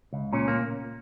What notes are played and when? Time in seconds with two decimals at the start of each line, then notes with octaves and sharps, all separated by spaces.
0.13 C#2
0.33 A#2 C#4
0.48 A#3